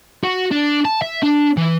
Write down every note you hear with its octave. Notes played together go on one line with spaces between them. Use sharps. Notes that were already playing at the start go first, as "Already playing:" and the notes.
F#4
D4
A5
E5
D4
E3